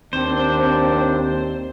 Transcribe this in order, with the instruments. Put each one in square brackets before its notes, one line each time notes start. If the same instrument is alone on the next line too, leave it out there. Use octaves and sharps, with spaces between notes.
[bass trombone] D#2 [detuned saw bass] C4 [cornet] D4 [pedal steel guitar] C5